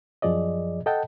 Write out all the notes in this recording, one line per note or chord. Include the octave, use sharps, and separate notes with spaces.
F#2 F3 G#4 D5 D#5
A4 D#5 F#5 G5 A5